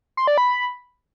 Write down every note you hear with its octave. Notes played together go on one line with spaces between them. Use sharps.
C6
D5
B5